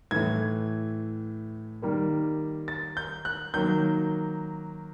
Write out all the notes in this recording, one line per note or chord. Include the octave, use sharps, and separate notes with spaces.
A2 E3 A3 G#6
D#3 G3 A#3
A6
G6
F#6
D#3 F#3 A#3 G6